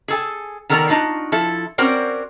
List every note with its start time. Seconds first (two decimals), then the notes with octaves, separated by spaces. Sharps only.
0.08 G#4 A4 G#5
0.69 D#3 B3 A4 A#4 D5 A#5
0.89 D4 D#4 F4 F#4
1.32 F3 E4 A4
1.78 C4 C#4 F#4 A#4 C5 D5